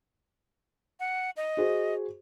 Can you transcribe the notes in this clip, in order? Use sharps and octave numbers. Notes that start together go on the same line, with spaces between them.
F#5
D#5
F#4 G#4 C5